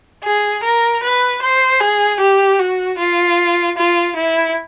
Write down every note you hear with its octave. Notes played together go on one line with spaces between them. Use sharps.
G#4
A#4
B4
C5
G#4
G4
F#4
F4
F4
E4